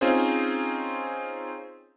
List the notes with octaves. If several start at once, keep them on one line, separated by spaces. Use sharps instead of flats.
C4 C#4 D#4 F4 G#4 C5